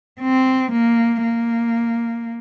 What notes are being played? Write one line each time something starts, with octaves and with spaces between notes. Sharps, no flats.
C4
A#3
A#3